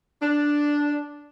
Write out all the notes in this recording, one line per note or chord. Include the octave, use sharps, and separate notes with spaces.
D4